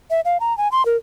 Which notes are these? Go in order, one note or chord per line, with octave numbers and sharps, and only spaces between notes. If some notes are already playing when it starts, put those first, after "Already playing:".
E5
F5
A#5
G#5
C6
A#4